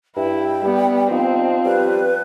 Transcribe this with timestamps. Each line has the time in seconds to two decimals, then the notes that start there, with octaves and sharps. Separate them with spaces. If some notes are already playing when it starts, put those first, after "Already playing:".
0.16 G2 E4 G5
0.63 G3 B3
1.11 F3 C4 D#4
1.66 G3 B4